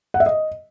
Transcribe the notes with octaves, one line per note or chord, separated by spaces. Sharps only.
F#5
E5
D#5